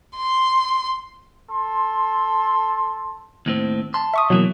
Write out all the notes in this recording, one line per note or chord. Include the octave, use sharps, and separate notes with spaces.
C6
A4 C6
D#2 A2 C4
A5 C6
E5 C#6 D#6
B2 E3 F#3 A#3